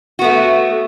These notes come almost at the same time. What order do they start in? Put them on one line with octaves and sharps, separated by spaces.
F#4 B3 A3